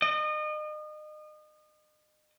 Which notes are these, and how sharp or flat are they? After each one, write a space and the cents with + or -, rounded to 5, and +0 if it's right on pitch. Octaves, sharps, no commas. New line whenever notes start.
D#5 -35